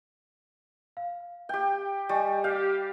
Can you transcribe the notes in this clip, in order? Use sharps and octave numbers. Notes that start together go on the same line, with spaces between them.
F5
G4 G5
G3 D#5 G#5 C#6
G4 F5 G6